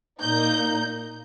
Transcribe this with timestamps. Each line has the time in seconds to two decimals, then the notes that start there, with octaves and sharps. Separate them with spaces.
0.20 A#2 A#3 D#4 G6